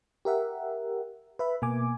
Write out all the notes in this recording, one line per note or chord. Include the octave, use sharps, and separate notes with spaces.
G4 A#4 E5 F#5
B4 E5 B5
B2 A#3 G#5 D6